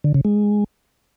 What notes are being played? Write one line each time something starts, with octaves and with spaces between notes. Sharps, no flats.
D3
C#3
G#3